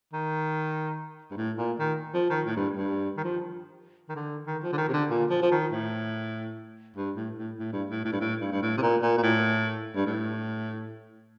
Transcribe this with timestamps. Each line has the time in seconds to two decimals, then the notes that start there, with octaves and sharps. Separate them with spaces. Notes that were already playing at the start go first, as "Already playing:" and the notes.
0.13 D#3
1.31 G2
1.37 A2
1.58 A#2
1.79 D#3
2.14 F3
2.30 D#3
2.46 A2
2.57 G2
2.77 G2
3.17 D#3
3.24 F3
4.09 D#3
4.16 D3
4.47 D#3
4.63 F3
4.73 D3
4.78 D#3
4.89 C3
4.93 D3
5.10 A#2
5.30 F3
5.42 F3
5.52 D#3
5.72 A2
6.96 G2
7.16 A2
7.38 A2
7.59 A2
7.73 G2
7.90 A2
8.05 A2
8.13 G2
8.21 A2
8.41 G2
8.52 G2
8.62 A2
8.77 C3
8.82 A#2
9.02 A#2
9.18 A#2
9.23 A2
9.96 G2
10.07 A2